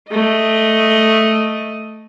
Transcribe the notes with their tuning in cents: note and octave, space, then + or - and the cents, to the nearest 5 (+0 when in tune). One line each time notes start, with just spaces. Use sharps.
A3 +0 D#5 +0